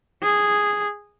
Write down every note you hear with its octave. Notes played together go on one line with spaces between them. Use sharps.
G#4